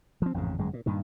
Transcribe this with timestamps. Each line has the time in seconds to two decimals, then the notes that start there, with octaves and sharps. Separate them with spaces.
0.22 F3 C4
0.34 A1 F2 G#2 C#3
0.59 G1 F#2 G#3
0.73 A#2
0.86 G2 A#2 D#3